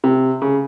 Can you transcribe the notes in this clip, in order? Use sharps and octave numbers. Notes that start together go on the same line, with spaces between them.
C3
C#3